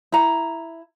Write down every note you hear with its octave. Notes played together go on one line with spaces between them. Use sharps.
E4 A#5